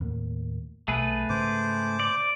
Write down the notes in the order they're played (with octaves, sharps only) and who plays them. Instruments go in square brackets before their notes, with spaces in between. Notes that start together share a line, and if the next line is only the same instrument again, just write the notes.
[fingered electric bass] D#2 A2 A#3
[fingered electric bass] B1 B2 [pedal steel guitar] A3 G#4 B4
[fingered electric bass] G#2 C#3 B3 [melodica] C5 D6
[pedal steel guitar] D5